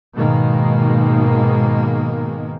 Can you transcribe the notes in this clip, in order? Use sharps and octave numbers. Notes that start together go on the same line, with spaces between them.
G#2 B2 D#3 G#3 A#3